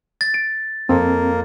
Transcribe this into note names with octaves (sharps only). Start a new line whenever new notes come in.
A6
D7
F2 A#3 C4